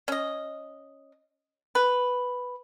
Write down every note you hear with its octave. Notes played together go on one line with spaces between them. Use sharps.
C#4 D#5
B4